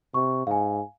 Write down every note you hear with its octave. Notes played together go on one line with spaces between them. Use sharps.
C3 C#6
G#2 F5 G#5